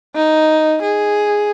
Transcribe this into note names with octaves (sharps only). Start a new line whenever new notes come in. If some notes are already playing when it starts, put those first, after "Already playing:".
D#4
G#4